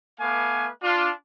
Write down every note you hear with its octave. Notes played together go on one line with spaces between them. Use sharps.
A3 B3 B4 F5 G#5 D6
D4 F4